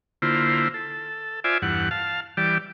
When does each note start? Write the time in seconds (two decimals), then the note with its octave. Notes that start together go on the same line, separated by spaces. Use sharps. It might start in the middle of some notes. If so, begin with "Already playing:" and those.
0.22 D3 A#3 E4 F4 C5
0.74 A4
1.44 F4 C5 D5 E5 G#5
1.62 E2 G2 F#5
1.91 F5 A5
2.37 E3 G3 G4 D5